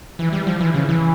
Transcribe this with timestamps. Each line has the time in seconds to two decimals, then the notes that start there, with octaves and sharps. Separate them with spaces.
0.19 E3
0.33 G3
0.47 F3
0.61 E3
0.74 C#3
0.89 E3